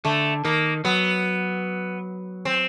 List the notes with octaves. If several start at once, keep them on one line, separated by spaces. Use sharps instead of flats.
D3 A3
D#3 A#3
F#3 B3
C4